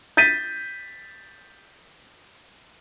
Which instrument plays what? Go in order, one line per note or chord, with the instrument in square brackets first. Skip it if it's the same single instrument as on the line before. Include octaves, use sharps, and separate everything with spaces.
[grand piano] G6 A6 B6 D#7